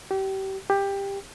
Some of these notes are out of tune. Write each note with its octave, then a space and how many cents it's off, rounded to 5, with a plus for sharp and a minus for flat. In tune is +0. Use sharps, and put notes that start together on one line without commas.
G4 -30
G4 +15